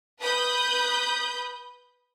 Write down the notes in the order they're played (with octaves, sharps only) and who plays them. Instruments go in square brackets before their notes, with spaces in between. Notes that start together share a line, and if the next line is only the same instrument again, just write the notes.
[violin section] B4 B5 D#6 G6